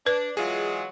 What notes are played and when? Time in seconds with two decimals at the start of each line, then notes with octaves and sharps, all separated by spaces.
0.07 D4 B4
0.37 E3 F#3 G#3 F4 G#4